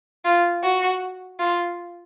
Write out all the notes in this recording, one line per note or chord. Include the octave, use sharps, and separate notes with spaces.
F4
F#4
F4